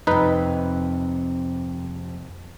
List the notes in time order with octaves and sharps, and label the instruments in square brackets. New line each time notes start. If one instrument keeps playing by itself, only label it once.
[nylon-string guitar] F2 C3 [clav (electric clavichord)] D#4 B4